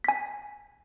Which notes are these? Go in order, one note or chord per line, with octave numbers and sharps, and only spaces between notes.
G#5 B6